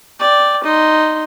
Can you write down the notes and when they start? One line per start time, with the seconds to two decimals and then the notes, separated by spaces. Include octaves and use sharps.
0.20 D5 G5
0.64 D#4 C6